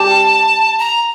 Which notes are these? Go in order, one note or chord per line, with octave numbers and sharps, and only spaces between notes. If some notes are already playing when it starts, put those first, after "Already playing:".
Already playing: G4 A5
A#5